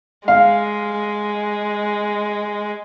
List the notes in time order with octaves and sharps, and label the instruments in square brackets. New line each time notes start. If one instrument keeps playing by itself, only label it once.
[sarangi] G#3 [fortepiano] F5